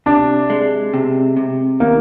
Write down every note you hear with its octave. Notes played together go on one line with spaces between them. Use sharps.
C3 D4
G#3
C3
C3
D#3 A#3